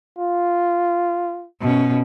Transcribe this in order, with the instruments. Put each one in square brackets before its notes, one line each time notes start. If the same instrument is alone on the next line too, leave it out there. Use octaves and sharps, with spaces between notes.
[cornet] F4
[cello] B2 C#4